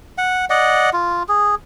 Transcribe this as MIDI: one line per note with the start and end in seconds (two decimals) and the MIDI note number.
0.18 0.45 78
0.50 0.90 74
0.50 0.90 75
0.50 0.90 78
0.93 1.23 65
1.29 1.55 68